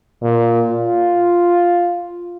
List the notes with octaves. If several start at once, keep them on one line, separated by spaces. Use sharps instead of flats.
A#2
F4